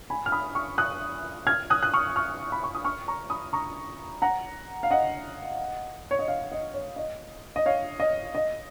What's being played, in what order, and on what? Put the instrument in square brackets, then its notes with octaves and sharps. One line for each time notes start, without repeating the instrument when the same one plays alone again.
[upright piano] G#5 B5
F6
B5 D#6
C#6 F6
D#6 F#6
F6 G#6
D#6 F#6
F#6
C#6 F6
C#6 F6
B5
C#6
D#6
C#6 F6
A#5 C#6
B5 D#6
A#5 C#6
F#5 A#5
F5
D#5 F#5
C#5
D#5
C#5 F5
D#5
C#5
D#5
D#5
C#5 F5
D#5
D#5